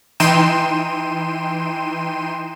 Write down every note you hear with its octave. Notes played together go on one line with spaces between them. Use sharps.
E3 D#4 G5 C6 D#7 E7